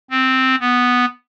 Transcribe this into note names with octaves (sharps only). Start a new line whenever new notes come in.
C4
B3